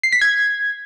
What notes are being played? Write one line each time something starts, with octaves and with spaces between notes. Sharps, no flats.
C7
B6
G#6